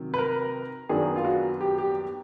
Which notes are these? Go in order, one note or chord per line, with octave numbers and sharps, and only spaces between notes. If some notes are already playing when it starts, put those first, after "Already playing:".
Already playing: C3 D#3 F#3
B4
A#4
F#2 D#3 F#3 B3 D4 G#4
F4
F#4
G4
G4